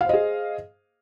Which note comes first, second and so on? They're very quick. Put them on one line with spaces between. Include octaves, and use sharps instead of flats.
F5 C5 D#5 G#4